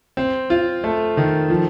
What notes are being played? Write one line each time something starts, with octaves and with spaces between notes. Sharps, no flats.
C4
F4
A3
D#3
F3